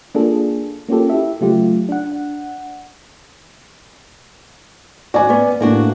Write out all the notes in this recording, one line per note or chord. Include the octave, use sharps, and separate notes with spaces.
A#3 D4 F4 G#4 A4
A#3 C#4 F4 G4 A4
E4 G4 E5
C#3 F#3 A3 F4 G4
D4 F#5
F#4 D5 G#5
B3 C#4
A2 A#3 D4 F#4